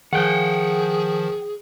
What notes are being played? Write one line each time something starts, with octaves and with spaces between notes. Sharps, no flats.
D#3 F3 G#4 F#5 G5